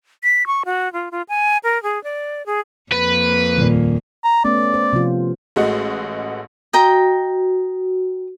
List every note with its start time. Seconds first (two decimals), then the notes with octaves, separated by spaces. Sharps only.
0.23 B6
0.47 C#6
0.65 F#4
0.93 F4
1.11 F4
1.29 G#5
1.64 A#4
1.83 G#4
2.04 D5
2.46 G#4
2.92 F2 A#3 B4
3.57 D#1 A#2
4.24 A#5
4.45 A3 B3 C#4 D5
4.74 C5
4.93 C3 F3 F4
5.56 A1 G#3 A3 F#4 D#5
6.73 F#4 D#5 G5 A#5